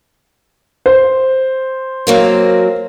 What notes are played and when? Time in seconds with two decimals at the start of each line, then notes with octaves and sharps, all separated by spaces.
0.86 C5
2.07 F#3 A#3 C4